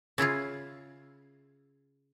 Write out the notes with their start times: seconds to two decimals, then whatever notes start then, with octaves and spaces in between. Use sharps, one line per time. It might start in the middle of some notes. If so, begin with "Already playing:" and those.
0.18 C#3 E4 F4 G#4